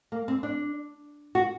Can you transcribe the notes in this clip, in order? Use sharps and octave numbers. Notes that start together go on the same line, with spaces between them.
A#3
C4
D4
F#4